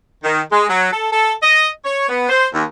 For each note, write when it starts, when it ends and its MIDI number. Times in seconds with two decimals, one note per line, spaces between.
0.24 0.40 51
0.52 0.64 56
0.69 0.92 54
0.92 1.08 69
1.12 1.32 69
1.42 1.68 75
1.84 2.05 73
2.09 2.27 59
2.29 2.46 72
2.53 2.64 39